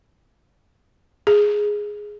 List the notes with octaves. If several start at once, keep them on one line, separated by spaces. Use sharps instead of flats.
G#4